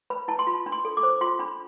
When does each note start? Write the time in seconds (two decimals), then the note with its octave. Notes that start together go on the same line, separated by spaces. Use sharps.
0.10 B4 B5
0.28 E4 A5
0.39 C6
0.47 F4 B5
0.66 D4
0.72 C6
0.85 A4
0.97 D6
1.03 C5
1.21 F4 C6
1.39 D4 B5